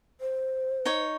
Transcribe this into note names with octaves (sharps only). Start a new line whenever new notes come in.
C5
D#4 C#5